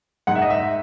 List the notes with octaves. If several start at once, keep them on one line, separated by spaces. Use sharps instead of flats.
G#2 F#5
E5
D#5
E5